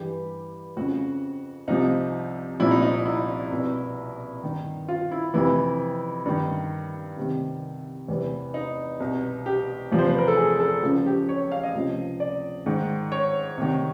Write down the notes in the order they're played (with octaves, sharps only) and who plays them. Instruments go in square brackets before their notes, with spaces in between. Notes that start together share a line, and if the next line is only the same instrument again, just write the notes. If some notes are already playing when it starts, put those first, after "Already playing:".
Already playing: [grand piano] G2 E3 G4
F2 C#3 F3 F#4
C2 C3 F3 D#4
C2 A#2 F3 E4
D#4
D#4
E4
C2 B2
G2 D#3
F4
E4
F2 C3 E3 E4
G2 D#3
C2 C3 D#3
E2 C3 E3
D#4
C2 B2
G4
E2 C3 F3
C5
B4
A#4
A4
G#4
A4
C#2 C#3 F3 F#4
G4
C#5
F5
D#5
C#2 C3 F3
D5
G#2 D#3
C#5
C2 C3 D#3